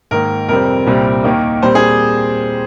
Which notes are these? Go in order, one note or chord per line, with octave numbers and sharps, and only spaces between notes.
G#2 D#3 A#3 A#4
F2 C3 G3 C4 A#4
C2 A#2 G3 C4
D#2 D#3 A#3
A#2 G3 C4 C5
G#4